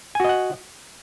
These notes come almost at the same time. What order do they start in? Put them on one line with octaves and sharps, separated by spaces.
G#5 F#4 D#5 F#5